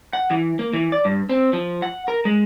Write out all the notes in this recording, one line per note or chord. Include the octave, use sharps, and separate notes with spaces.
F#5
E3
A#3
E3
D5
G2
C4
F3
F#5
A#4
G#3